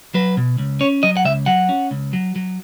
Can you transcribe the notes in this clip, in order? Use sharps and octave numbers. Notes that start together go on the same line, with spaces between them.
F#3 B4
B2
C#2
C#4 C#5
F#3 D#5
F#5
C#2 E5
F#3 F#5
C#4
C#2
F#3
F#3